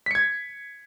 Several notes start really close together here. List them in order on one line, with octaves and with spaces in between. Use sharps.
B6 C#7 G#6